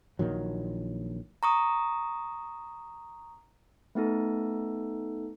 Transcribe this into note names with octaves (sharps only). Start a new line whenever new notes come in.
A#1 A#2 D#3 F#3
A#5 C#6 D#6
A3 B3 D#4 A4